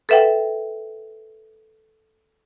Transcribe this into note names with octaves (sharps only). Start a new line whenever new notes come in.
A4 B4 E5 F#5 G5